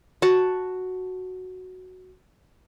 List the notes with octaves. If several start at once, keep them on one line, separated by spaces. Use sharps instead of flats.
F#4 A5